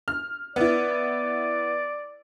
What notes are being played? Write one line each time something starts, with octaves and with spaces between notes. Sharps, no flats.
F6
B3 E4 D5